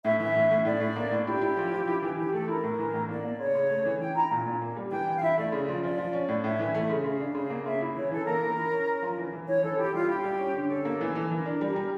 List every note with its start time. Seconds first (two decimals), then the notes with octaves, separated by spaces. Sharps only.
0.04 A2 E5
0.19 E3 E5
0.35 A2
0.51 A2
0.65 A2 D5
0.80 A2
0.96 A#3
1.11 A2
1.27 E4 G4
1.41 E4
1.57 F3
1.72 F3
1.87 E4
2.02 E3
2.17 E3 G4
2.33 A3 A4
2.48 E4 A#4
2.63 A2
2.79 E3
2.94 A2
3.09 A#3 D5
3.24 A#3
3.40 C#3 C#5
3.55 C#3
3.70 A3
3.85 E3
4.01 E3 G5
4.15 E4 A#5
4.31 A#2
4.46 A#2
4.62 A#3
4.76 G3
4.91 E3 G5
5.07 E3
5.17 F5
5.22 E4 E5
5.37 A3 D5
5.52 C#3
5.68 F3
5.83 F3 D5
5.98 F3
6.13 C#4
6.29 A2
6.44 A2 E5
6.59 E3
6.75 A3
6.89 C#3
7.04 C#3 F5
7.20 D4
7.35 C#3
7.50 A#3
7.66 C#3 E5
7.81 E4
7.96 E3 C#5
8.11 E3 A4
8.26 A#3 A#4
8.42 E3
8.57 E4
8.72 C#4
8.87 C#4
9.03 F3
9.18 E3
9.32 E3
9.48 E3 C#5
9.63 E3 A4
9.78 E4 G4
9.93 G3 F4
10.09 E4 G4
10.24 G3
10.39 C#4
10.55 D3
10.69 C#4 A4
10.85 A#3
11.01 E3
11.15 E3
11.31 E3 A#4
11.46 D4
11.61 G3
11.76 G3